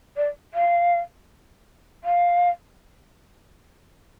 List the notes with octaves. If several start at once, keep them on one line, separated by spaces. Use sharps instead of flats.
D5
F5
F5